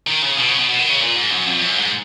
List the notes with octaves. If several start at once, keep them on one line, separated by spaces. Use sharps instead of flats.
D#3
C#3
B2
C#3
B2
B2
D#3
C#3
A#2
G#2
F#2
F2
F#2
G#2